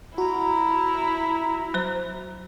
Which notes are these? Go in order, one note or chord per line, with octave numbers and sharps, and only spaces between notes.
E4 F#4 A#5
F#3 C5